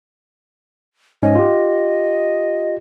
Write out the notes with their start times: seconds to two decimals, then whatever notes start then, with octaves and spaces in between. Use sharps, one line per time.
1.23 G#2 C#4 D#5
1.35 F4 G4